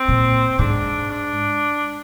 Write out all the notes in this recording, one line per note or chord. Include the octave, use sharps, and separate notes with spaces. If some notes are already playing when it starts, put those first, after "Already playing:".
Already playing: C4
A#2
G#2 D4
D4